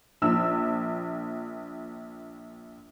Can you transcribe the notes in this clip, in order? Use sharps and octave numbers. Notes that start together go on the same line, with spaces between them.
A#1 E6